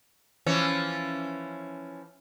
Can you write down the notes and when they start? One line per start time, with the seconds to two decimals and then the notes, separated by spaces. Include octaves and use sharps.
0.46 E3 F3 C#4